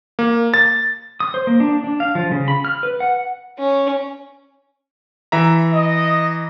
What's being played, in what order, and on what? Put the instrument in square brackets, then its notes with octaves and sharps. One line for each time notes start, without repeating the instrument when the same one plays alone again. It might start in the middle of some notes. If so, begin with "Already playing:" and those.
[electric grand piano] A#3
A6
[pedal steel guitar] D#6
C5
A#3
D4
D4
F5
F3
C#3
B5
F6
B4
F#5
[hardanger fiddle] C#4
[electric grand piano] E3 E5 A#5
[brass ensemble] D#5